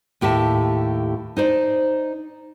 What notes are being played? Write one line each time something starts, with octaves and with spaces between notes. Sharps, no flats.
D#2 A2 G4 E5 A5
D#4 C5 D5